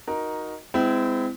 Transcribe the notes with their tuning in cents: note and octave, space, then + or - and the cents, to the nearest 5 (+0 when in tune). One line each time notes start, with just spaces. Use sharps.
D#4 +0 F#4 -5 A#4 +10
G#3 -15 C4 -30 E4 +0